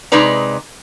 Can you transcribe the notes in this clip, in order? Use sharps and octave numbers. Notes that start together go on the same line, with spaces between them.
C3 G#3 D#4 B4 D5 A#5